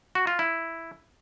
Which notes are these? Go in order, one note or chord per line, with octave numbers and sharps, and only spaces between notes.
F#4
F4
E4